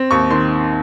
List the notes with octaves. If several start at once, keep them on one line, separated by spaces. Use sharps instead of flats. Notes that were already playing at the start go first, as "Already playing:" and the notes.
Already playing: C4
D#2 C#6
D#3 C6